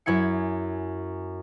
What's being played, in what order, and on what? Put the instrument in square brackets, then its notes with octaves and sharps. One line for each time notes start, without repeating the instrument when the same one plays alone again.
[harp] F#2 E4 G#5 C#7